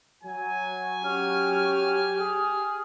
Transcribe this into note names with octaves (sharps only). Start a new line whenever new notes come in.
F#3 G#5
C#4 G4 F6
G#4